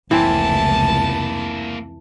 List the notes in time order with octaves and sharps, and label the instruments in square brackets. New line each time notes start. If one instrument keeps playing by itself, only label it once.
[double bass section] F1 C#2 [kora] E3 C4 [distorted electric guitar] A#3 E4 [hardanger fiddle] A5